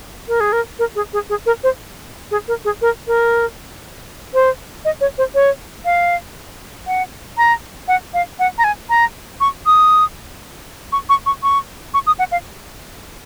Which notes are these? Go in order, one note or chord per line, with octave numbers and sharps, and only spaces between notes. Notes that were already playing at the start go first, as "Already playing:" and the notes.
A#4
G#4
A#4
A#4
G#4
G#4
G#4
A#4
C5
G#4
A#4
G#4
A#4
A#4
C5
D#5
C#5
C5
C#5
F5
F#5
A#5
F#5
F5
F#5
A#5
G#5
A#5
C#6
D#6
C#6
C#6
C#6
C#6
C#6
D#6
F#5
F5